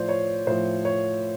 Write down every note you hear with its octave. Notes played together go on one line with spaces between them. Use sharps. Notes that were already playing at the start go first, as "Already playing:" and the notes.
Already playing: A2 F3 C5 D5
C#5
A2 F3 C5
C#5